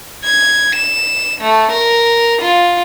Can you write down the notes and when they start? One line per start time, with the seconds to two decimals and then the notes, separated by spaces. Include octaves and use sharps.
0.24 G#6
0.76 E7
1.41 A3
1.72 A#4
2.42 F4